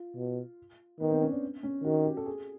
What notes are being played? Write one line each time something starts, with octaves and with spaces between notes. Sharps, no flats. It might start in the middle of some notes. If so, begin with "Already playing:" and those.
Already playing: F4
B2
D#3 B3
C4
C#4
D4
C#4
D#3 F#4
G4
A4
G#4